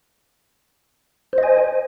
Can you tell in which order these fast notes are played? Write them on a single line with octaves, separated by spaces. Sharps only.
C5 D#5 G#5